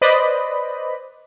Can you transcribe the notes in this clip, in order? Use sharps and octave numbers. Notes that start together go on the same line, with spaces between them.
B4 C5 D5 D#5 B5